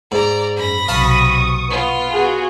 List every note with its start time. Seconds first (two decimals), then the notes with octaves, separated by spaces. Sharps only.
0.12 G#2 D5 A#5
0.56 F#2 B5 A#6
0.88 B1 C3 F5 A5 C#6 D#6
1.70 B3 F4
2.10 F#4 G#4